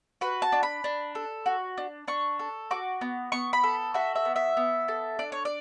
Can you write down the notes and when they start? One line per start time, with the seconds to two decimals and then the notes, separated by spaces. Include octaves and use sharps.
0.21 F#4 B4
0.42 A5
0.52 D4
0.63 B5
0.84 D4
1.15 A4
1.46 F#4
1.77 D4
2.08 D4 C#6
2.39 A4
2.71 F#4 D6
3.01 B3
3.32 B3 C#6
3.53 B5
3.63 A4
3.94 F#4 E5
4.16 E5
4.25 B3
4.36 E5
4.57 B3
4.88 A4
5.19 D4 D5
5.32 C#5
5.45 D5